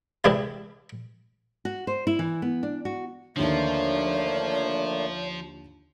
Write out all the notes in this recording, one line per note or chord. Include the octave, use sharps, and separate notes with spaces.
C3 E3 G#3 D4 E4 G4
F#4
C5
E4
E3
B3
D4
F#4
D#2 D3 F3 A3 A#3 D4 C#5